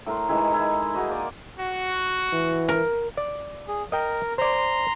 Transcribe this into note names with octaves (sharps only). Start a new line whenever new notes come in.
A2 A#4 C6
D#3 E3 G#3 E4
D#4 E4
G#3 D#4 F#4 D#5
A#3 D5
F#4
E3
A#4
D5
G#4
A#4 D#5 G5
C5 D5 A#5 C6